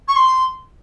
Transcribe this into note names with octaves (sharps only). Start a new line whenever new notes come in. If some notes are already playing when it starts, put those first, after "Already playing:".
C#6
C6